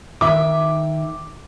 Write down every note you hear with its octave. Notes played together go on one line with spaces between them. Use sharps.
D#3 E5 D6